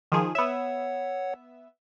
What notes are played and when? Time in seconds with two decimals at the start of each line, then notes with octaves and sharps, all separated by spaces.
0.12 D#3 F3 G#4
0.35 B3 C#5 E5 F#5